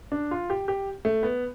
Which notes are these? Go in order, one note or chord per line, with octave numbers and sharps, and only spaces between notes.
D4
F4
G4
G4
A3
B3